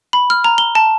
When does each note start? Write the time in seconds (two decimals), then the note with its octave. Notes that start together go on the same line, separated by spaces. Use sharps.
0.13 B5
0.30 F6
0.44 A#5
0.58 G7
0.75 A5